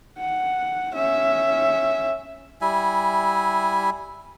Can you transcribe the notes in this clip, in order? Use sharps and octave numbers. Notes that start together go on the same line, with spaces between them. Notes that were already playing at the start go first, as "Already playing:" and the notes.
F#5
C#4 E5
G3 E4 E5 G#5